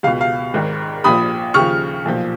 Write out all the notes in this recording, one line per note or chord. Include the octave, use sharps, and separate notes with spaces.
C#2 B2 F5
F5
G#1 G#2 D#3
A#1 A#2 F3 B5 D#6
D#2 C#3 F3 C#6 F6
B1 A#2 F3